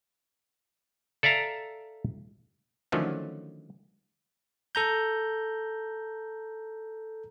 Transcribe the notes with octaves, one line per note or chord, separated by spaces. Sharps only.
A4 D5 E5 F5 A#5
D3 D#3 F3 F#3 A3 C#4
A4 A#5 G6